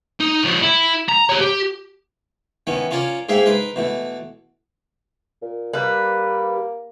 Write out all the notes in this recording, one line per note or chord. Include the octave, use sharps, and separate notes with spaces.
D#4
F3 C#5
E4
A#5
G4 C#5
G4
D#3 E3 B3 C#4
C#4 F4 A#4 C#5 D5
G#2 A#3 G#4 E5 F5 G5
D#4 A#4 B4 C6
B2 E3 A3
A#2
G3 A#3 B4